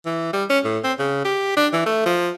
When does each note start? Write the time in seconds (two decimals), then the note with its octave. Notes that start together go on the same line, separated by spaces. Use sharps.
0.06 E3
0.33 G3
0.50 C#4
0.65 A2
0.84 C4
0.99 C#3
1.25 G4
1.57 D4
1.73 E3
1.86 A3
2.06 F3